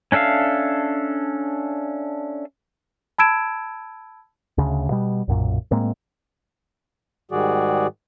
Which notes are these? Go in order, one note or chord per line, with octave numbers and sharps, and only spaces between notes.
C#4 D4 A4 E5 F5
A5 B5 E6 G#6 D7 E7
D2 C#3
B2 G3
B1 F#2 A#2
A2 G#3 A#3 C4
G#2 D#3 G3 F#4 G#4 D5